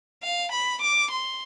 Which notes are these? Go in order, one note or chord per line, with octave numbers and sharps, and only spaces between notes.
F5
B5
D6
C6